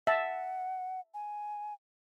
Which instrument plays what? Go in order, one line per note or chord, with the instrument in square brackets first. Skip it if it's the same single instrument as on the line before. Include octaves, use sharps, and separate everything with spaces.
[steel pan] E5 A5 [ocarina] F#5
[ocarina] G#5